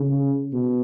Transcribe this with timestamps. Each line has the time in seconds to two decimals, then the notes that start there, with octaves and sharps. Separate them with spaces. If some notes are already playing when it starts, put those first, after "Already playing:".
Already playing: C#3
0.53 B2